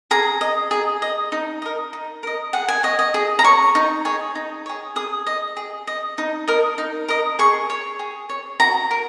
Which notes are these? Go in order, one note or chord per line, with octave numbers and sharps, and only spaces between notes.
G#4 A#5
D#5
G#4
D#5
D#4
A#4 D#5
D#4
A#4 D#5
G#4 F#5
G#5
C#5 D#5
D#5
G#4
A#5
C#5 C#6
D#4
G#4 C#5
D#4
G#4 C#5
G#4 D#6
D#5
G#4
D#5
D#4
A#4 D#5
D#4
A#4 D#5
G#4 C#6
C#5
G#4
C#5
F#4 A#5
A#4